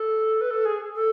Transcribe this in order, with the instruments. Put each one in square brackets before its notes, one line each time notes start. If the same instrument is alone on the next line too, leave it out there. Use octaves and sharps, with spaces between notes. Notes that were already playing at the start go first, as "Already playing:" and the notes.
Already playing: [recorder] A4
B4
A4
G#4
A4